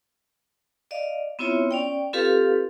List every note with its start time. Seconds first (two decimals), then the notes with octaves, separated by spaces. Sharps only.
0.91 D5 D#5 F5
1.39 B3 C4 E4 F4 C#5 E5
1.71 C#4 D5 G5
2.13 C4 F4 G4 A4 B4 F5